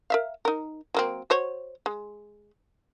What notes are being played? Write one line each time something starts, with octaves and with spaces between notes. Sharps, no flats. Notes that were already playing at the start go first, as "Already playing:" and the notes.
A#4 E5 F5
D#4 A#4
F#3 A#3 C4
F#4 C5 C#5
G#3